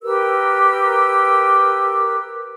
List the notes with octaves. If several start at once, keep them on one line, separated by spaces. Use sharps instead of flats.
G4 A#4 B4 E6